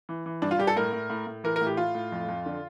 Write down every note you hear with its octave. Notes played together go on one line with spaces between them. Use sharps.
E3
E3
G2 D4
F4
G2 G4
A4
A2 A#4
A2
A2
A2
E3 A#4
A#4
A2
G4
A2 F4
A2
F2
F2
D3